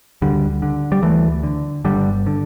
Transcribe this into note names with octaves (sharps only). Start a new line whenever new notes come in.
D2 D3 G3
D3
G3
D2 E3 A3
D3
G1 D3 G3
D3